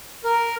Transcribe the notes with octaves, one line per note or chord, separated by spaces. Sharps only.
A#4